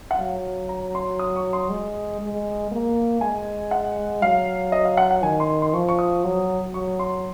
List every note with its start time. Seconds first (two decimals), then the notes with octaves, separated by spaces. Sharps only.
0.11 F#5
0.19 F#3 F5
0.69 A#5
0.95 C6
1.19 D#6
1.36 C#6
1.53 C6
1.69 G#3
2.21 G#3
2.71 A#3
3.21 G#3 G#5
3.71 F#5
4.22 F#3 F5
4.72 D#5
4.85 F5
4.97 F#5
5.11 F#5
5.22 D#3 G#5
5.40 C6
5.62 C6
5.73 F3 C#6
5.89 C#6
5.99 D#6
6.24 F#3
6.74 F#3 C#6
6.99 C6